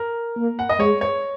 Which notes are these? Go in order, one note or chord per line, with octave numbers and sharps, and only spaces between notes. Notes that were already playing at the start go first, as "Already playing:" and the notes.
Already playing: A#4
A#3
F#5
D#5
G#3 C#5
C#5